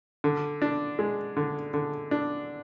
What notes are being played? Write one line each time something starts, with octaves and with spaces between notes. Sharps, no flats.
D3
D4
G#3
D3
D3
D4